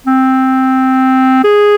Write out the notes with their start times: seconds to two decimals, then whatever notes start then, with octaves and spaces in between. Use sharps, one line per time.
0.07 C4
1.44 G#4